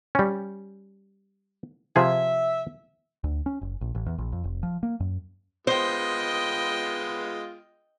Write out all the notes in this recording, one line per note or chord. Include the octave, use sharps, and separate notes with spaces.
G3 C#4
C3 F3 G#4 E5
D2
C#4
F#1
A#1
A1
E2
A#1
F2
F1
F3
A#3
F#2
G#3 B3 F4 C5 D#5 G5